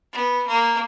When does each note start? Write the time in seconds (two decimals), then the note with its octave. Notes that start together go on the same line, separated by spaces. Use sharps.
0.13 B3
0.46 A#3